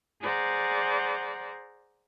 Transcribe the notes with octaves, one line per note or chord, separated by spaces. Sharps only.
G#4 C5 D5 F#5 A#5